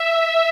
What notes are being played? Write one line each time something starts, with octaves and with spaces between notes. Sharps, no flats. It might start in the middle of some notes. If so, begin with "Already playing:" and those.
Already playing: E5